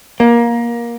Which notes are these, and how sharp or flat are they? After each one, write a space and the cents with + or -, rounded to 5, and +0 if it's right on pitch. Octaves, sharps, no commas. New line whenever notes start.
A#3 +20